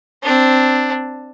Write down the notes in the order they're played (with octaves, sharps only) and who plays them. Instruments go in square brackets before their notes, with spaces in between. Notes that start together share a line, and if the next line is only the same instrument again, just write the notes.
[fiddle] C4 D4